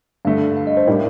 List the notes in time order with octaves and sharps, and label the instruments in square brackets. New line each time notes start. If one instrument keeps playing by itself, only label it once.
[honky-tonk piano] G2 D3 A3 [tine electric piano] F5
[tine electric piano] F5
D#5
C5
[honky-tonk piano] A2 G3 D4 [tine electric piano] A#4